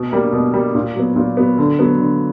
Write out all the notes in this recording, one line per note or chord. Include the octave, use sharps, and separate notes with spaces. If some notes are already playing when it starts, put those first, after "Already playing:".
Already playing: B2
G3 A#3
B2
G3 A#3
A#2
F#3 B3
A#2
F#3 B3
D3
F#3 B3
D3